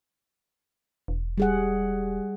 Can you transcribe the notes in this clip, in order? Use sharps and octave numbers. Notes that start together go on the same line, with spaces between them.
E1
G3 G#4 F#5